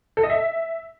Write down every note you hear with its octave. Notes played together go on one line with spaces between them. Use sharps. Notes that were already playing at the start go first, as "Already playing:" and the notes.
A4
D#5
E5